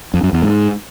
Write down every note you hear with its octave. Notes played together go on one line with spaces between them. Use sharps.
F2
F#2
E2
G#2